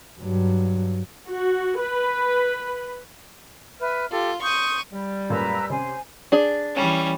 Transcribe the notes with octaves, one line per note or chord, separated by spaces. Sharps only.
G2 F#3
F#4
B4
B4 E5 F6
F4 G4 A4
C6 C#6 D#6 G6 D#7
G3
F#2 A#2 A3 B4 A#5 E6
C3 C#4 C5 G#5
D4 G#4 D5
E3 G3 C#4